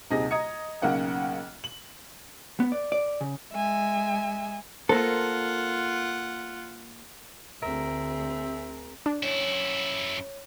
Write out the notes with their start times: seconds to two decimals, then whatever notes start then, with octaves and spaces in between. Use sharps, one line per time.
0.10 D#1 C3 D#4 G#4 A#6
0.31 D#5 A#5 D#6 G#6 C#7
0.82 B1 C#3 A#3 F#5 G5
1.64 F#7
2.60 B3
2.72 D5
2.92 D5
3.21 C#3
3.53 G#3 E5 G#5
4.89 A#3 F4 A4 A#4 C5 F#5
7.63 D2 C4 G#4 A#4 E5
9.06 D4
9.23 F#2 E4 C#5